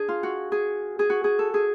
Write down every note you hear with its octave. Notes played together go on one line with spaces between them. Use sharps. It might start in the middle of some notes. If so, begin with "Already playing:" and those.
Already playing: D4 G#4
F4
F#4
G#4
G#4
F#4
G#4
A4
G#4